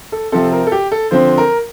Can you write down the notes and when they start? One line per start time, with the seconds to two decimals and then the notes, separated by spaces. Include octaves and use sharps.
0.12 A4
0.32 C3 F3 C4 A4
0.52 A#4
0.67 A4
0.72 G4
0.92 A4
1.11 D3 F3 C4 C5
1.38 A#4